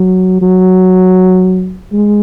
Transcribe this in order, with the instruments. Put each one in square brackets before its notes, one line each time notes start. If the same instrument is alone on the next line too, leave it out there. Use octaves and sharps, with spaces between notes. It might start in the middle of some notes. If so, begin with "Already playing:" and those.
Already playing: [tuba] F#3
F#3
G#3